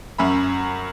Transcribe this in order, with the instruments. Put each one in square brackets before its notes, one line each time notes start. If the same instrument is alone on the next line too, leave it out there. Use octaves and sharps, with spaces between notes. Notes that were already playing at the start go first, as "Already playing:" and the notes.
[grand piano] F#2 C#4 E5 B5